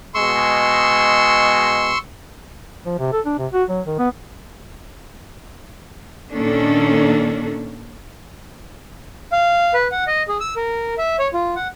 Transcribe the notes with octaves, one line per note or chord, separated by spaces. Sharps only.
B2 G#3 C6 C#6 E6
F3
C3
A4
D4
C3
F#4
F#3
D#3
B3
A#2 D#3 A#3 C#4 D4 A4
F5
B4
F#5
D#5
G#4
E6
A#4
E5
C#5
F4
F#5